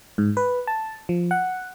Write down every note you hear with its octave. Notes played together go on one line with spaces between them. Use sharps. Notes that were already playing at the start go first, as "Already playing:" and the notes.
G#2
B4
A5
F3
F#5